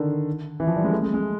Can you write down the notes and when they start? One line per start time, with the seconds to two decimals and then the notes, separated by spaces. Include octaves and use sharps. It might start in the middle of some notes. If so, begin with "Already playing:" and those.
Already playing: D3 D#3
0.60 E3
0.67 F3
0.76 G3
0.84 G#3
0.92 A3
1.03 G#3
1.14 G#3